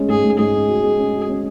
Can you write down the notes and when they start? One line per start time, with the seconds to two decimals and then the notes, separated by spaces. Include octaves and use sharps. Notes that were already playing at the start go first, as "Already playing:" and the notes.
Already playing: G#3 C#4
0.09 G#2 G#4
0.24 G#2
0.39 G#2 G#4
0.54 C#4
0.69 F#4
0.84 G#3
0.99 C#4
1.14 F#4
1.29 C#4